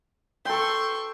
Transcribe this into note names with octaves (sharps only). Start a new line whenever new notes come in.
A4 G5 C6 C#6